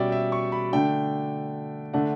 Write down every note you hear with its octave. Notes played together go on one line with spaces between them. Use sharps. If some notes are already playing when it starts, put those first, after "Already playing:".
Already playing: B2 G3 C#4 D5 E5 G5
E5
C#6
B5
D3 A3 D4 G5
D3 A3 D4 F#5